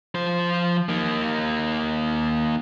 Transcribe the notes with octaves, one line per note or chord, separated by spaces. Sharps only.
F3 C5
A#3 D#4